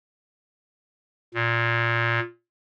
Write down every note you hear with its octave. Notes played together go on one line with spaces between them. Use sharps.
A#2